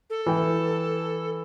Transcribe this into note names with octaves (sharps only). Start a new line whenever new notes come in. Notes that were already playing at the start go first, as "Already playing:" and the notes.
A4
E3 G5